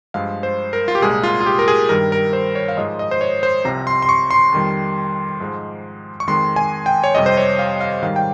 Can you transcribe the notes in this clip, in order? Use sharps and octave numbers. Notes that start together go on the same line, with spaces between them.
G2 F3 G#3 F5
C5
A#4
F4
G4
C2 A#2 G#3 G#4
F4
F4
G4
A#4
G#4
G2 D#3 G3 A#4
A#4
C5
C#5
F5
G#2 F3 G#3 D#5
D#5
C5
C#5
C5
C2 C3 F3 A#5
C6
C6
C#6
C6
F2 D#3 G3
G#2 F3 G#3
C#6
F2 D#3 G#3 C6
G#5
G5
C#5
F2 C3 G3 D#5
C5
C#5
F5
F5
G#2 D#3 G3 F5
G5